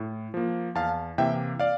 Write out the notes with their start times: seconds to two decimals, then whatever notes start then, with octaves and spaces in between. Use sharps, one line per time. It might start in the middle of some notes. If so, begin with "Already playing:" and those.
Already playing: A2
0.34 F3 A#3
0.75 E2 F5 A5
1.18 C3 E3 A#3 E5 G5
1.60 D5 F5